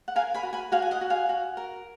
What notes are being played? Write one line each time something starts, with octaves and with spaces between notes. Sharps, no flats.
F#5
A#4 F5 G#5
G#5 B5
F#4
G#5 B5
F#4 F5 G#5
G#5
D#5 F#5
F#4
F5 G#5
F#4
A#4